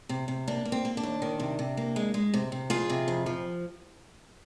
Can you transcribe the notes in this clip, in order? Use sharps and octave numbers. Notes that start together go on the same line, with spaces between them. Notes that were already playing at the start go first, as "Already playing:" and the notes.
C3
C3
A#3 D4
A#3
C4
A#3
D4
D#2
D#3
C3
C3
A#3
G#3
G#3
C3
C3
F2 F4 G#4
C3
F2
F3